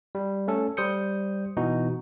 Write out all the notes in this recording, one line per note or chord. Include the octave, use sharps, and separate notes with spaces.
G3
A3 C#4 A4
G3 C5 D#6 G6 C#7
B2 E3 D#4 F#4